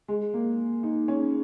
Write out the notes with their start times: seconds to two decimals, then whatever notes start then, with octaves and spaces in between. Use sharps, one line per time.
0.08 G#3
0.34 A#3
0.83 D#4
1.08 C#4